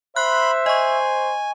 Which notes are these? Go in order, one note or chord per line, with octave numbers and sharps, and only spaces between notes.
C5 E5 B5 C6 F#6
D#5 G#5 C#6